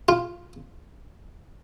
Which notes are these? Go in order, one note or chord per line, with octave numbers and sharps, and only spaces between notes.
F4